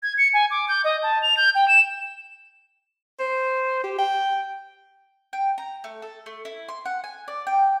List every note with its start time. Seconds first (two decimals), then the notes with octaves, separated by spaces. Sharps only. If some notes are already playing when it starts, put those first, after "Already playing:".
0.03 G#6
0.18 C#7
0.33 G#5
0.51 D6
0.68 G6
0.84 D#5
1.03 A5
1.22 F7
1.37 G6
1.55 G5
1.68 E7
3.19 C5
3.84 G4
3.99 G5
5.33 G5
5.58 A#5
5.84 A3
6.02 A4
6.26 A3
6.45 E4
6.69 C6
6.85 F#5
7.04 G#5
7.28 D5
7.47 G5